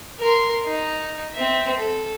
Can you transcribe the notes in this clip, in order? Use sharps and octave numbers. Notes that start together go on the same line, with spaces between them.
A#4 C6
D#4
C4 E5
A4